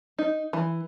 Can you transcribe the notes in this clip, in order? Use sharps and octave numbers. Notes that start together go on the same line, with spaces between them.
D#4
E3